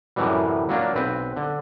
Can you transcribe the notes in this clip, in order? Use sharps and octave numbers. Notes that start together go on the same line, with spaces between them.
F#2 A2 C3 E3 F#3 G3
F#3 A#3 D4 F4
B1 C4 B4
D3